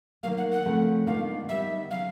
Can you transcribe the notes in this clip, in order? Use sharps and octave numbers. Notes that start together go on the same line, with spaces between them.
D#3 F#3 A#3 F5
F#5
F#5
C#3 F3 A3 C4
D#3 G#3 B3 D4 F4 F5
D#3 G3 B3 D#4 E5
C#3 F#3 F5